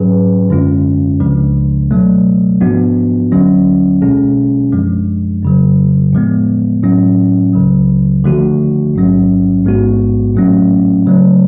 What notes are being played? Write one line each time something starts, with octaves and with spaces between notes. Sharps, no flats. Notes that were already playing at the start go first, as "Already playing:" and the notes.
Already playing: G#2 F#3 C#4 G#4 B4
F#2 D3 G#3 C#4 F4
C#2 C#3 F3 G#3 D4
B2 F#3 A3
G#2 F3 B3 D4 F#4
D2 D3 F#3 C#4
B1 B2 G#3 C#4 G#4
F#2 F3 G#3 D4
F2 C#3 F#3
A2 F3 G#3 B3
A2 F#3 C#4
C#2 C#3 F#3
D3 F3 A3 D4 F#4
A1 G#2 F#3 C#4
A1 G#2 G#3 B3 F#4
A2 F#3 A3 C#4
C#3 F#3 A3